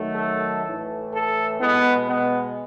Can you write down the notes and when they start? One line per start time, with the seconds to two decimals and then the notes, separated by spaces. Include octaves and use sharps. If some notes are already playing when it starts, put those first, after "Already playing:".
Already playing: D#3 F#3 A3
0.16 A4
0.65 A2 E3 A3
1.13 A4
1.61 B2 G#3 B3
2.08 B3